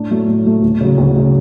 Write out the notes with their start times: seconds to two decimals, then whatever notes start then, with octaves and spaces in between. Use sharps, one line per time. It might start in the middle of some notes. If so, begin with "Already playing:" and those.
Already playing: A2 D4
0.11 F#3 A3
0.28 A2
0.45 F#3 A3
0.62 D2
0.81 C#3 F#3
0.98 D2
1.16 C#3 F#3